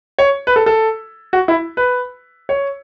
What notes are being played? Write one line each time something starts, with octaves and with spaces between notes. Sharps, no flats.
C#5
B4
A4
A4
F#4
E4
B4
C#5